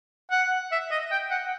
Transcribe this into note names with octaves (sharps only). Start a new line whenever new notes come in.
F#5
E5
D#5
G5
F#5